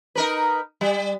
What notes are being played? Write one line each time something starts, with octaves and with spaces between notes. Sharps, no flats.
D#4 A#4 B4
G3